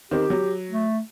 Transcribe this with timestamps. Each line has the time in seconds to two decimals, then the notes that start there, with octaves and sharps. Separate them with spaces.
0.11 D#3 C4 G4
0.30 F#3
0.71 A3